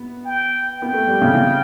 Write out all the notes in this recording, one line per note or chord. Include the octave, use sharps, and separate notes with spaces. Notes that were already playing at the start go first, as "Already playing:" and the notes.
Already playing: B3
G5
B3 G5
A3
G3
C#3
C#3